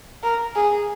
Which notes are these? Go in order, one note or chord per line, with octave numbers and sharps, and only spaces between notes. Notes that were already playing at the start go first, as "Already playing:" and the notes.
A#4
G#4